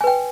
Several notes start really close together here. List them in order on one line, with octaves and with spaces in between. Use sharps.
G#5 B4 G5